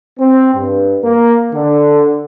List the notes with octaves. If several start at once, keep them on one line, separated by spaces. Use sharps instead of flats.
C4
G2
A#3
D3